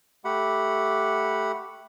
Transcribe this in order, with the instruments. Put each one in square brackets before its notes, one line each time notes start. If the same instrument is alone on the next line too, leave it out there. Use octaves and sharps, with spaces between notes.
[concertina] A3 G4 F#5 B5